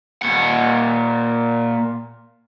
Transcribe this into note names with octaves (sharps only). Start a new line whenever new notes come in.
A#2 F#5